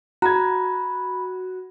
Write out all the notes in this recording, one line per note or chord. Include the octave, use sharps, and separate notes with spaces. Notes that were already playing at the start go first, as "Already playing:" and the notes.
F#4 A#5 B5 G#6